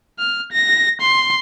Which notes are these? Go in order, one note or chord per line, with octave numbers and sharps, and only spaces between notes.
F6
A#6
C6